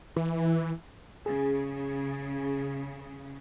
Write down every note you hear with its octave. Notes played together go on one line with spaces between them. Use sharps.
E3
C#3 G#4